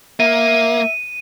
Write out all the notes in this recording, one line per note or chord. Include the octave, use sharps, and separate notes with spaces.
A#3 E5 D#7